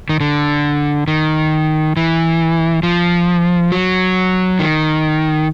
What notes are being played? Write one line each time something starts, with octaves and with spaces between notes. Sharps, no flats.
D#3
D3
D#3
E3
F3
F#3
D#3